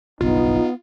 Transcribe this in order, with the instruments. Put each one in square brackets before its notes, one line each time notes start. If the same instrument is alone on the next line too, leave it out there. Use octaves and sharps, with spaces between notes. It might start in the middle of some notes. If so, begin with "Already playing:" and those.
[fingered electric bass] F#1 B1 G2 [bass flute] B3 [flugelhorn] D#4 [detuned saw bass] F4